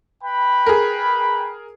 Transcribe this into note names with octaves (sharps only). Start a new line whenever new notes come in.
B4 G5 B5
G#4 A#4